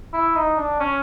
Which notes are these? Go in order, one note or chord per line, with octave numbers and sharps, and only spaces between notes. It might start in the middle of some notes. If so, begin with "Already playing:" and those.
E4
D#4
D4
C#4